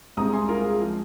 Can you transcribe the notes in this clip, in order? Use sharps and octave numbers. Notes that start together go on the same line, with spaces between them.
C2 C3 G#3 C4 A#5 D#6
G#5 C6
F4 A#4
G#4
F3 G#3 C4